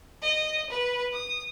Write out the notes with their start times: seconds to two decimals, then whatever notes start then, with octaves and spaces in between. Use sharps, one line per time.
0.22 D#5
0.70 B4
1.13 D#6